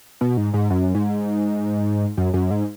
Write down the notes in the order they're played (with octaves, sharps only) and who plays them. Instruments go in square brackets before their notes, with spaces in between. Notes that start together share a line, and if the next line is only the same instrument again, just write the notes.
[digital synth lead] B2
G#2
G#2
F#2
G#2
F#2
F#2
G#2